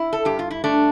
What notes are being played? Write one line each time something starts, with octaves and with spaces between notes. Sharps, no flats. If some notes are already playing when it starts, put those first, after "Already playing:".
Already playing: E4
A4
G2 G4
F4
E4
A3 D4